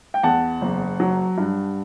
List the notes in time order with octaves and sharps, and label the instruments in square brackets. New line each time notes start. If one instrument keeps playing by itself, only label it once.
[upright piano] G5
E2 F#5 A5
F#1
F#3
G2